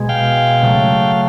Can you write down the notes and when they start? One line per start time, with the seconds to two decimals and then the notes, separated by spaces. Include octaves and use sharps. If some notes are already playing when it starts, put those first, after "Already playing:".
Already playing: B2 G#3
0.09 F5 G5
0.63 C#3 F#3 A3